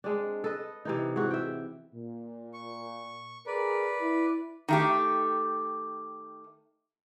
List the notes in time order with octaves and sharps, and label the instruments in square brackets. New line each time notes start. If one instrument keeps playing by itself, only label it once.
[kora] G#3 C4 D4
A4 B4 D#5
C3 E3 D#4
G#2 E3 F#4
E5 G5
[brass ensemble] A#2
[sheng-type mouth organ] C#6
[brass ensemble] G#4 A#4 A#5 [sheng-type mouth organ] B4 D5
[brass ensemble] E4
[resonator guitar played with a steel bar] D#3 A3 G4